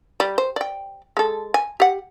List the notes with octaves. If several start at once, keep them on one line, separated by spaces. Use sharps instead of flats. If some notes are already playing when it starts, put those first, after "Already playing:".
G3
C5
D5 G5
G#3 A4
G#5
G4 F#5